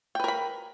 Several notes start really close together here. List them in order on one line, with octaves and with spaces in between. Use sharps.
G5 B4 A#4 B5